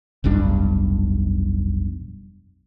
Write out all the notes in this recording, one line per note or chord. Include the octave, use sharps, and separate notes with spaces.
F1 B1 G2 D4